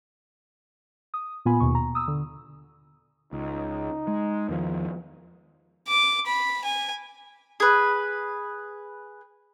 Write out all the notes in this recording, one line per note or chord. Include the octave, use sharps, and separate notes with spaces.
D#6
A#2 B3 F4 G#5 B5
D#2 B2 C#6
A#5
D#6 E6
D3
C#2 D#4
G#3
E2 D#3 F3
D6
B5
G#5
G#4 B4